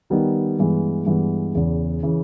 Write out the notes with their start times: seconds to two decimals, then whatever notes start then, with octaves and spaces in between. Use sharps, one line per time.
0.10 D#3 G3 B3 D#4
0.59 G2 E3 G#3 B3
1.06 G2 E3 G#3 B3
1.55 E2 C#3 E3
2.03 C#3 E3